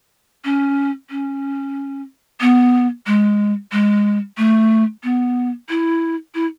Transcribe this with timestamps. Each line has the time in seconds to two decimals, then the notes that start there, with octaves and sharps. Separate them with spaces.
0.45 C#4
1.10 C#4
2.41 B3
3.07 G#3
3.72 G#3
4.38 A3
5.03 B3
5.69 E4
6.35 E4